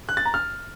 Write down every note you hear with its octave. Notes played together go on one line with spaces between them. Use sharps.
F#6
A6
A#5
F6